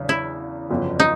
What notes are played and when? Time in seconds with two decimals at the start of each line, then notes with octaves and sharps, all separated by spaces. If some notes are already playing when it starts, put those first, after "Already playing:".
Already playing: E2 C#3 F#3 D4
0.09 E4
0.70 G1 F2 C#3 F#3 B3
1.00 D#4